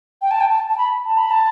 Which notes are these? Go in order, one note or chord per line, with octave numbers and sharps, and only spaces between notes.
G5
A5
G5
A5
A5
B5
A5
B5
A5